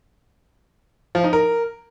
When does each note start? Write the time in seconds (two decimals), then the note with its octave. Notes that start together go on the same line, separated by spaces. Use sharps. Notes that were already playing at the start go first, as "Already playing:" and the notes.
1.15 F3
1.24 D#4
1.33 A#4